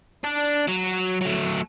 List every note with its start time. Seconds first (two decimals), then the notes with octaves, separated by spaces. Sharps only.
0.24 D4
0.68 F#3
1.22 F#3 A3